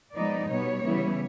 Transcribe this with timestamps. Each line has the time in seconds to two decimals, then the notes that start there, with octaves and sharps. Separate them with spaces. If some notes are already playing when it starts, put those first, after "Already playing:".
0.14 F3 G#3 B3 D#4 D5
0.48 B2 G3 B3 C#5
0.83 C#3 E3 G3 B3 E4